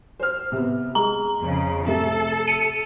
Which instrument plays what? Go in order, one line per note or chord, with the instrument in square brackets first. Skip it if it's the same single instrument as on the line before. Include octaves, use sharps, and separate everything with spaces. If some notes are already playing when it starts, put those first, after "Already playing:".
[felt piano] C5 F6
C3 B3
[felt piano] G#3 [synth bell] A#5
[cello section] F2 C#3
[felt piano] C3 A3 [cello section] A4
[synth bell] C#7 D#7